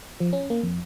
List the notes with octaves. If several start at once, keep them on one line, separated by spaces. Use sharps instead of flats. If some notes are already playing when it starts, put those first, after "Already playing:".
F3
C#4
A#3
F2